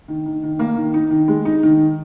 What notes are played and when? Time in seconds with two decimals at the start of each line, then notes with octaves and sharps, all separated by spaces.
0.08 D#3
0.26 D#3
0.43 D#3
0.59 A#3
0.77 D#3
0.94 D#4
1.11 D#3
1.28 G#3
1.45 D#4
1.63 D#3